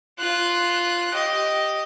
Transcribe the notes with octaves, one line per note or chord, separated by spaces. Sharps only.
F4 F#6
G4 D#5